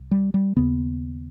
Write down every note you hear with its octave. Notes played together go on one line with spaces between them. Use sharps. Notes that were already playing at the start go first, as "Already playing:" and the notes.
Already playing: C2
G3
G3
D#2 C#3 B3